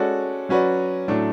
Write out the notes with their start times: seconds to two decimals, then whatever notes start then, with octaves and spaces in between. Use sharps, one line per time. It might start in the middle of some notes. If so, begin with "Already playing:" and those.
Already playing: G#3 C#4 F#4 A4 D5
0.49 F#3 C#4 F#4 B4 D5
1.08 A2 F#3 A3 D4